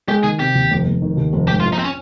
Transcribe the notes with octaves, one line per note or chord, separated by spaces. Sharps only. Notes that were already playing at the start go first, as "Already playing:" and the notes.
G#3 G4
D#3 G#4
C3 G4
D#2
F1
F1
D#3
D#2
F1
G#2 G4
F4
A#1
D#4
C4
C#4